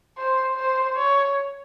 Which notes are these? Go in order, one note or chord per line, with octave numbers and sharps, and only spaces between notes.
C5
C5
C#5